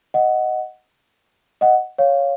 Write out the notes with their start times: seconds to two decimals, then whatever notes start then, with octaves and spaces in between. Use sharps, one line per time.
0.14 D#5 F#5
1.61 D#5 F#5
1.98 C#5 F5